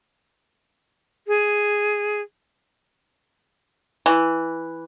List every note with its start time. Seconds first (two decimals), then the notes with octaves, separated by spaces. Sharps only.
1.27 G#4
4.06 E3